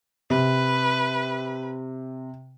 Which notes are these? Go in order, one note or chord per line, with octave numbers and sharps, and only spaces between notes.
C3 B4